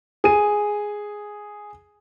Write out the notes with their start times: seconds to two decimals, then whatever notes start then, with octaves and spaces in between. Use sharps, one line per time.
0.24 G#4 D#7